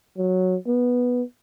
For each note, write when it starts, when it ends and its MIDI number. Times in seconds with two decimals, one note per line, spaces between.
0.18 0.56 54
0.67 1.23 59